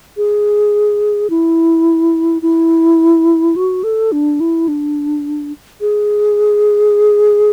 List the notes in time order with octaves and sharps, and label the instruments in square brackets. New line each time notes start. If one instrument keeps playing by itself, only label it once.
[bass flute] G#4
E4
E4
F#4
A4
D4
E4
D4
G#4